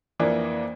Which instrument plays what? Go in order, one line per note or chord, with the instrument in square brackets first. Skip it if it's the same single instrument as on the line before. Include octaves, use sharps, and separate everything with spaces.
[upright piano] F2 E3 A#3 D4